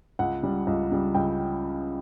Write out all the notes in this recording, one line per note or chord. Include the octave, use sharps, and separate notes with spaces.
C#2 F#5
C#3 G3
C#2
C#3 G3
C#2 G5